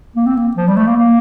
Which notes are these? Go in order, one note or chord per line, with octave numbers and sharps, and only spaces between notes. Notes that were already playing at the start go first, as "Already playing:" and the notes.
A#3
C4
A#3
F3
G3
A3
A#3
A#3